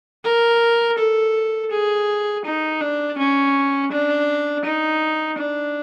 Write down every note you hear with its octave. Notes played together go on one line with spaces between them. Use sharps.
A#4
A4
G#4
D#4
D4
C#4
D4
D#4
D4